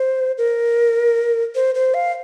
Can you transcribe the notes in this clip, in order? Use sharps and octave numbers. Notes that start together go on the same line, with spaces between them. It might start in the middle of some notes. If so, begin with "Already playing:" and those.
Already playing: C5
A#4
C5
C5
F5